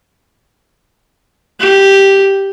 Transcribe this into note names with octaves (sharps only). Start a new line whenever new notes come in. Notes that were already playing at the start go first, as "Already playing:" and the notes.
G4